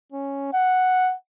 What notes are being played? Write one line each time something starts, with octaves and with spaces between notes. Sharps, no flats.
C#4
F#5